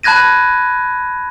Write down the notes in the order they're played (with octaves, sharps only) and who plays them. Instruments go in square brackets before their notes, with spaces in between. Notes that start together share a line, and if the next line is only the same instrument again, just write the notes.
[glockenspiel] A5 B5 F#6 G#6 A#6 D#7